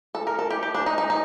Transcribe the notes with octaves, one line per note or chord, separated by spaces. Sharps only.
A4
A#4
A4
G4
G4
D4
D#4
D#4
D#4